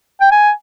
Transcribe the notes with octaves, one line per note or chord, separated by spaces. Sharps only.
G5
G#5